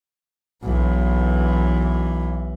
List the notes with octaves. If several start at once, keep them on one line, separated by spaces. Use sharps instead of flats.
B1 E3